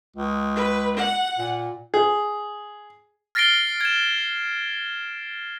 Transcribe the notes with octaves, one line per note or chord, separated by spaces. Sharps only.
C#2
B4
F#5
A#2
G#4
F6 A6 A#6 C7 D7 G7
G#6 E7